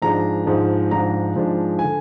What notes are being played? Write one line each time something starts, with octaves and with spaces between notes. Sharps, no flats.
G#2 F3 G#3 D4 A#5
G#2 F3 G#3 D4
G#2 F3 G#3 D4 A#5
G#2 F3 G#3 D4
D3 G#5